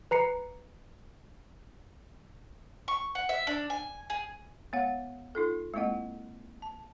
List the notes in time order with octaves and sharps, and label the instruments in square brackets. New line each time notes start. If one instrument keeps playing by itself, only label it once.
[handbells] B4 A#5 C7 C#7
[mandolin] C#6
F#5
E5
D4
G#5
G#4
[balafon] G#3 B3 C#5 F5 F#5
D#4 F4 A4
G#3 A#3 C4 E4 D#5 F#5
A5